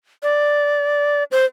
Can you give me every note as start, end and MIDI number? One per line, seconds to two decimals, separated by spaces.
0.23 1.24 74
1.32 1.45 72